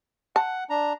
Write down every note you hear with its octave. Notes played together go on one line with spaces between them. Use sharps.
F#5 A5
D4 A#5